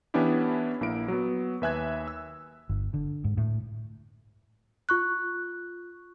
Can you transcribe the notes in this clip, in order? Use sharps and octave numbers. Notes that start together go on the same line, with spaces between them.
E3 B3 C#4 D4 E4 G4
A#1 A#3 E4 D7
F#3 B3
D#2 B4 E5 G#5 F#6 G#6
E6
G1
D3
G#2
A2
F4 C#6 F#6